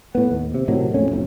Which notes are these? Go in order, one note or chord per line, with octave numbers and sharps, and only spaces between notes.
A2 B3
D#2
C3
A2 C3 D#3 F#3
F2 A2 A3 C#4
F1 B1